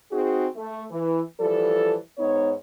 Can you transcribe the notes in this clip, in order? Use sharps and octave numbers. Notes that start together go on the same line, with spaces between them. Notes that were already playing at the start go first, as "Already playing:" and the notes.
C4 D#4 F#4 G#4
A3
E3
E3 F3 G3 A4
G#2 B3 D#4 C#5